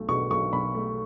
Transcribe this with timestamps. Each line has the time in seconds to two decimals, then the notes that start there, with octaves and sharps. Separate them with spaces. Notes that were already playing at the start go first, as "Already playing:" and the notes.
Already playing: B1 A3
0.09 B2 C#6
0.31 B1 C#6
0.53 B1 B5
0.75 A3